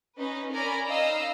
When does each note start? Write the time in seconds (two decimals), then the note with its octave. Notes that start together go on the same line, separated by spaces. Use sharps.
0.18 C#4 D#4 B4
0.51 C#4 A#4 D5 G#5 A#5 B5
0.88 D#4 D#5 F5 A#5 E6